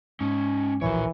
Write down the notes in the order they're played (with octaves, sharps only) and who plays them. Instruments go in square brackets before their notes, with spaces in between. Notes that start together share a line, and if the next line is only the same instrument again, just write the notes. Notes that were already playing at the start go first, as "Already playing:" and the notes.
[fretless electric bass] G#2 [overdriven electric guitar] C#4 D#4
[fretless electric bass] D1 A#1 F3 [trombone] E3 [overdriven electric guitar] A#4 C#5